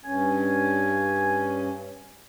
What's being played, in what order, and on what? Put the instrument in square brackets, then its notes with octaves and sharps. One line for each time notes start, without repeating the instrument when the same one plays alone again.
[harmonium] G2 C#4 [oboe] G#5